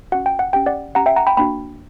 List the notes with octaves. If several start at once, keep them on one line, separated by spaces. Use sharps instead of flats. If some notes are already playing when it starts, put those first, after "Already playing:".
C#4 F#4 F#5
G5
F#5
C#4 G4 G5
D5 F#5
C#4 G4 F#5 A#5
E5 G5
F#5 A#5
G5 B5
A#3 D4 F#4 G5 B5